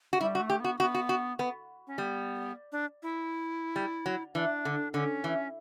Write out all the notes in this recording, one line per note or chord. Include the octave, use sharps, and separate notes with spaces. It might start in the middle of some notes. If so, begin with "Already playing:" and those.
F#4
G3 E4
F#4
A3
G4
B3 F#4
B3 F#4
F#4
F#4
B3
C#4
G3 B3
D4
E4
G3
F#3
E3 D4
D3
D3 C#4
E3